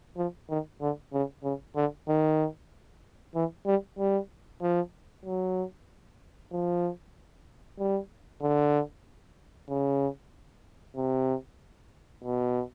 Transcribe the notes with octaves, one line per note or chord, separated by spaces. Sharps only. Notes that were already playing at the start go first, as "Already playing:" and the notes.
F3
D#3
D3
C#3
C#3
D3
D#3
E3
G3
G3
F3
F#3
F3
G3
D3
C#3
C3
B2